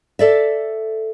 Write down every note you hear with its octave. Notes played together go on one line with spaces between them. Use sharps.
A4 D5 E5